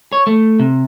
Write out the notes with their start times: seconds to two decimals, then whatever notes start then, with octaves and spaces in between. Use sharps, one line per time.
0.13 C#5
0.27 A3
0.59 C3